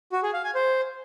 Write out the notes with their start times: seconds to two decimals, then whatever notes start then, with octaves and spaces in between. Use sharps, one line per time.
0.12 F#4
0.23 G#4
0.34 F5
0.44 G#5
0.55 C5